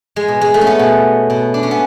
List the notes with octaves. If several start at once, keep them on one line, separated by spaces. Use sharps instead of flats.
G#3
B2
G#3
A3
C#4
B3
B2
B2
D4
C#4
B3